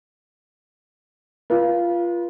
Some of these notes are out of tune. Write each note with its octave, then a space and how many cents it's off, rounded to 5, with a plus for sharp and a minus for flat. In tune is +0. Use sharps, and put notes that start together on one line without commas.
F4 -15 B4 -40